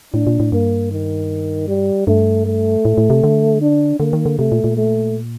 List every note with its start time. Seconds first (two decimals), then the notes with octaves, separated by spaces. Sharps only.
0.14 A2 D4
0.27 A#2
0.40 A2
0.52 G2 A#3
0.92 D#3
1.68 G3
2.07 G2 A3
2.46 A3
2.85 A2
2.98 A2
3.10 C3
3.24 D3
3.62 D4
4.00 D3 A#3
4.13 D#3
4.26 D3
4.39 C3 A3
4.52 A#2
4.64 A#2
4.77 A3